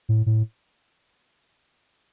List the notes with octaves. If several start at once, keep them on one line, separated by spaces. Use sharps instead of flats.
A2
A2